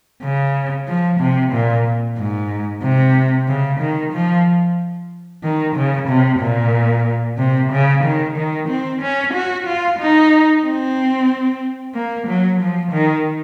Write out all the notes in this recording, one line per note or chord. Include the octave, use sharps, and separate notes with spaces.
C#3
F3
C3
A#2
G#2
C3
C#3
D#3
F3
D#3
C#3
C3
A#2
C3
C#3
D#3
D#3
C4
C#4
F#4
F4
D#4
C4
A#3
F#3
F3
D#3